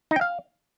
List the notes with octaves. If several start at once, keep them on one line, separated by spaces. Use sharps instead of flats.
D#4
G5
F5